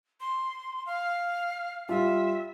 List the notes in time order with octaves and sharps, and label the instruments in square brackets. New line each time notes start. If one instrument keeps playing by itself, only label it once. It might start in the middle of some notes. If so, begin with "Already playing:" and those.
[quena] C6
F5
[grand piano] G3 F4 F5 [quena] E5